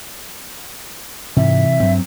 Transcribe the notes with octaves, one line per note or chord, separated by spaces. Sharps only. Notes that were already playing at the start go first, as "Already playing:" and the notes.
G#2 C3 E3 E5
G2 F#3 C4